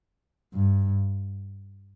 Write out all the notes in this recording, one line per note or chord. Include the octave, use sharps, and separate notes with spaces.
G2